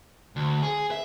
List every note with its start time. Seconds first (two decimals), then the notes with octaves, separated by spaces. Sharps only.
0.36 D2
0.63 G#4
0.91 E5